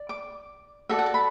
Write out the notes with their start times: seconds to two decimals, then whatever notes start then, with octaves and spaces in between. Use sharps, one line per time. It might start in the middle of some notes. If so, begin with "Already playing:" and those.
Already playing: D5
0.09 D6
0.89 F#4 A4 D5 E5
0.99 F#5
1.06 A5
1.14 B5